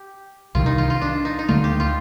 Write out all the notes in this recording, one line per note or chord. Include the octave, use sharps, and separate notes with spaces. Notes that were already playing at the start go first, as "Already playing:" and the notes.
Already playing: G4
C2 C3 D#3 F4
D#4
F4
F4
D4
D#4
D#4
D2 D3 A3 F4
G4
F4